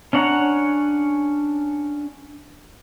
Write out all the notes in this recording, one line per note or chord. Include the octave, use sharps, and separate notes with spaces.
C#4 D4 C#5 F#5 A#5